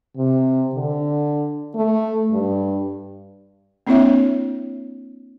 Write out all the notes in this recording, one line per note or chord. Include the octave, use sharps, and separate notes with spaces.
C3
D3
A3
G2
A#3 C4 D4 E4 C#5 E5